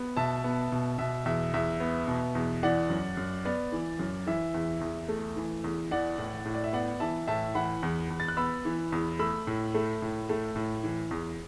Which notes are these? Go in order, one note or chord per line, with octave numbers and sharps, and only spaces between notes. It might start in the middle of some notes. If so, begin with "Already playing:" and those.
Already playing: B3
B2 E5 A5
B3
B2
B2 E5
E2 E5
E2 E5
B3
B2
E2
E3 D5 F#5
F#2
F#2
B3 D5
E3
F#2
E3 E5
E2
E2
A3
E3
E2
E3 D5 F#5
A2
A2
D5
E5
B3 D5 F#5
E3 E5 A5
A2 E5 A5
E3 F#5 B5
E2
E2
A6
F#6
B3 B5 E6
E3
E2
A3 B5 E6
A2
A3
A2
A3
A2
E3
E2